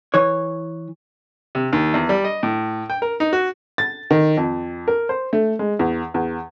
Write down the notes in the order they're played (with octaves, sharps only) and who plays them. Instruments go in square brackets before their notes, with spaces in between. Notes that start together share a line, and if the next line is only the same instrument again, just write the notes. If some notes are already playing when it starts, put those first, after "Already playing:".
[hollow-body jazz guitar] E3 C#5
[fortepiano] C3
D#2
E2
G3
D#5
A2
G5
A#4
D#4
F#4
[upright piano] A6
D#3
F2
A#4
C5
A3
G#3
E2
E2